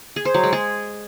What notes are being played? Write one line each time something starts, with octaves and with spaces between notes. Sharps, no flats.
G#4
C5
F#3
G#3
G#4